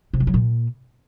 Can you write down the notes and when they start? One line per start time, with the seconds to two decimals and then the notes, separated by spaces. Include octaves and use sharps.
0.14 C3
0.20 F3
0.27 F#3
0.34 A#2